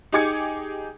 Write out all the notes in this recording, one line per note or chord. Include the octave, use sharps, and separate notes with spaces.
D#4 G4 G#4 D6 G#6 C#7